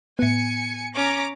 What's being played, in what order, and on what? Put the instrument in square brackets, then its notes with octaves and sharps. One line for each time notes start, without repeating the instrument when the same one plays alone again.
[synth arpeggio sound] A2 B3 [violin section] G#5 C#7
[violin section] C#4 A#5 D6